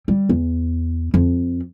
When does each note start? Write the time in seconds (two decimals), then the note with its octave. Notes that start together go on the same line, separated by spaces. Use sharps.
0.08 G3
0.29 E2
1.14 F2